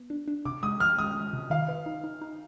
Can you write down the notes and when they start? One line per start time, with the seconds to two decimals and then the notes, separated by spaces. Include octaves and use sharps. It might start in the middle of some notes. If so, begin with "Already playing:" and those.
Already playing: B3
0.10 D4
0.28 D4
0.45 C3 D6
0.63 G#3 D#6
0.80 F3 F6
0.98 G#3 D#6
1.15 G#3
1.33 C3
1.50 D#3 F5
1.68 B4
1.86 D#4
2.04 D#4
2.21 D#4